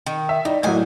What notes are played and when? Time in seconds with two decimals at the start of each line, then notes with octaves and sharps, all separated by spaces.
0.06 D#3
0.29 E5
0.45 G3 D#4
0.63 A2 F#3 A#3 D#5 G#5